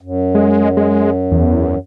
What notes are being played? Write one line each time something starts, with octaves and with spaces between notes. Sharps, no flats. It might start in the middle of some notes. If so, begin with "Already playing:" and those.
F#2
G#3
G#3
E2